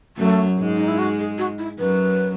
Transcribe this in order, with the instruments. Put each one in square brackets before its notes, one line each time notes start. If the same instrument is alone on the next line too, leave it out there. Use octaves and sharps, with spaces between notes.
[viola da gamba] F#2 F#3 [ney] A3
[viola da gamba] G#2 G#3
[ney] D#4
E4
F#4
G#4
F#4
E4
[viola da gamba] F#2 F#3 [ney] B4